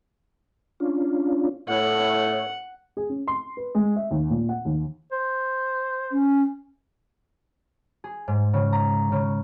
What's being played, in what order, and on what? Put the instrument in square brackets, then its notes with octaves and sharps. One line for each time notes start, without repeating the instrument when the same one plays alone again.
[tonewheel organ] C#4 D4 F4
[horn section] A2 [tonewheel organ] C#5 [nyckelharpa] F#5
[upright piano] G#4
C#4
C6
B4
G#3
E5
D#2
A#2
F#5
D#2
[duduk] C5
[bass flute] C#4
[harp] G#4
G#2
C#3
A#5
C#3